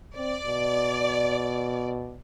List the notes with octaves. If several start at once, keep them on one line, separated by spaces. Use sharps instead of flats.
C4 D5
B2